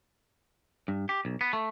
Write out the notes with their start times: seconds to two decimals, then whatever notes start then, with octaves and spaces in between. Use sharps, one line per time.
0.88 G2
1.09 G4
1.25 B1
1.41 B3
1.53 A3